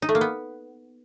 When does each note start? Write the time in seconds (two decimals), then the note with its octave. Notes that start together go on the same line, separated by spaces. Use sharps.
0.02 D#4
0.09 A3
0.15 A#3
0.21 B3